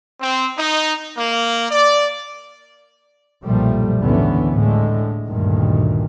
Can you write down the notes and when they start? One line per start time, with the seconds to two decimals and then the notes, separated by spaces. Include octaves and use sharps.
0.21 C4
0.57 D#4
1.18 A#3
1.71 D5
3.44 B1 F#2 A#2 F3 G3 A3
3.99 G#1 D2 D3 E3 B3 C#4
4.53 A2 D3 G#3 A3
5.26 D2 G2 A#2 D#3